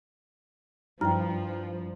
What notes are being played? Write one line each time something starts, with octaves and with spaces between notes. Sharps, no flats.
G2 F3 E4 F4 G5 A#5 F6